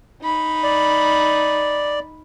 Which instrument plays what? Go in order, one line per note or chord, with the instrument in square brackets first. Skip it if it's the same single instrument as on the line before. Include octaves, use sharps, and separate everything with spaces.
[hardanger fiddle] D#4 B5
[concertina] D5